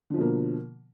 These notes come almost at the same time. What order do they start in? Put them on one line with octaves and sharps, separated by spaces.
D3 F3 B2 A#3